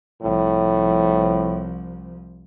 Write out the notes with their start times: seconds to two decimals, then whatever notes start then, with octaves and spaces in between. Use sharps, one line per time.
0.22 C2 A2 F3